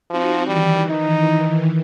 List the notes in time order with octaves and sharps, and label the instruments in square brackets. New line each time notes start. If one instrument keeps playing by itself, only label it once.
[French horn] F3 [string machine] C4 D#4 F#4
[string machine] D#3 E3 [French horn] G3
[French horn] D#4